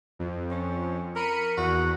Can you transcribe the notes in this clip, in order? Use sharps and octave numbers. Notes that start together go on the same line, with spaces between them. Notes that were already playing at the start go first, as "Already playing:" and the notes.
F2
C#4
A#4 B5 C#7 D#7
E2 F#4